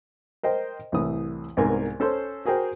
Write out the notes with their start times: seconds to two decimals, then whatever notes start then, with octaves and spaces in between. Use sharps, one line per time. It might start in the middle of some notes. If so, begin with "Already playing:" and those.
0.43 A#4 C5 D#5 G5
0.92 C2 A2 E3 D#6
1.57 C2 G#2 B3 A#4 G#5
2.00 C#4 A4 C5 C6
2.45 F#4 G#4 A#4 C5 G5